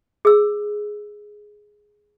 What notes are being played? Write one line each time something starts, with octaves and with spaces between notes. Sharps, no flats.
G#4 E6